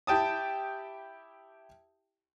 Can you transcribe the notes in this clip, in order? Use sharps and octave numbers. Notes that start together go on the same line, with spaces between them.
E4 G4 G5 A5 D#6